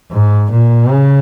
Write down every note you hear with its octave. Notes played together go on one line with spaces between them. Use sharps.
G#2
A#2
C#3